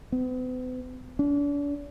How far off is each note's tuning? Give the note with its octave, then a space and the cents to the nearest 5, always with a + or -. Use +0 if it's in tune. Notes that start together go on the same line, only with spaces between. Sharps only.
B3 +45
D4 -40